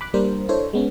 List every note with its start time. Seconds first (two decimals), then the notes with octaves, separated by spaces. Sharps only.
0.01 B5 D6 F#6
0.14 G3 A#3 D4 A#4 C5
0.49 D4 E4 A4 C5 C#5
0.73 G#3 B3 C#4